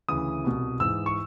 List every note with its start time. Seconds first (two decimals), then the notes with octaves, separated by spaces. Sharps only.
0.09 D2 C#3 E3 D#6
0.44 C2 B2
0.80 G#2 E3 E6
1.06 C#6